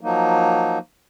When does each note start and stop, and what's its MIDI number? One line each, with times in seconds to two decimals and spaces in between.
0.01 0.79 53
0.01 0.79 54
0.01 0.79 58
0.01 0.79 63